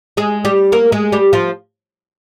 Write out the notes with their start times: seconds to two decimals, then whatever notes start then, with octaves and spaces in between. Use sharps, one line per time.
0.17 G#3 G#4
0.45 G3 G4
0.72 A#3 A#4
0.92 G#3 G#4
1.12 G3 G4
1.33 F3 F4